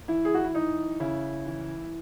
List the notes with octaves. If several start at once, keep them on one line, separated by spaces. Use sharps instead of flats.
E3 E4
G#4
F#4
E4
E3 D#4
C#3 E4
E3